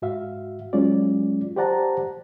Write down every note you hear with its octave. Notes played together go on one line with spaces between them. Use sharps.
G#2 F#4 E5 F5
F#3 G#3 C#4 F4 D5
G4 C5 D5 F#5 A5 A#5